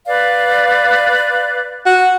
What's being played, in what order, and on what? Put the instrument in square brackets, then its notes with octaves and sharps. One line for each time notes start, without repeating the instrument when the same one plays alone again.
[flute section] B4 D5 F5
[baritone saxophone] F#4